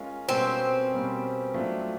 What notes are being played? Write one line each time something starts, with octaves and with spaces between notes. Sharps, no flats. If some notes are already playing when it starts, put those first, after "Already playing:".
Already playing: G#3 C#4 F4 A#4
B2 G3 A#3 C4 C#4
B2 G3 A#3 C#4
F#3 A3 D4 F4